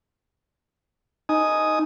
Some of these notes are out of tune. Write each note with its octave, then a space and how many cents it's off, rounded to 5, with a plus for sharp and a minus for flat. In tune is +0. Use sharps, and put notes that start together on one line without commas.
D#4 +0 G#5 +10 D#6 +0